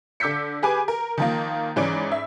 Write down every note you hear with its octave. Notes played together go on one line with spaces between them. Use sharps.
D3 D6 E6 G6 B6 C#7
G4 G#4 B4 G#5 D6
A#4
D#3 F3 A#3
G#2 E3 C#4 D5 D7
E5